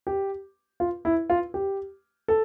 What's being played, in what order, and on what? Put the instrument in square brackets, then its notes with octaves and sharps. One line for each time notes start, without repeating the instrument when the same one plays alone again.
[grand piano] G4
F4
E4
F4
G4
A4